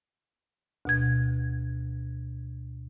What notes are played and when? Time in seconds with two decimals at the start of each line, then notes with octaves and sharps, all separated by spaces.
0.85 D2 B2 G#6